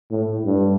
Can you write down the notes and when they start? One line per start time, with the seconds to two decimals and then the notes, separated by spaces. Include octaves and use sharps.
0.10 A2
0.45 G2